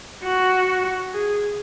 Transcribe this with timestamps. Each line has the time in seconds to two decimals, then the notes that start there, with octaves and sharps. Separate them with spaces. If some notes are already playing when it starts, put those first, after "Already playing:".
0.23 F#4
1.13 G#4